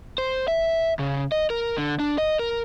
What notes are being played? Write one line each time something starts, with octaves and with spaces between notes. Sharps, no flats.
C5
E5
C#3
D#5
A#4
D3
D4
D#5
A#4